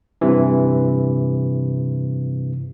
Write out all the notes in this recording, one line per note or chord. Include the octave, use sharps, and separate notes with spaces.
G2 C3 E3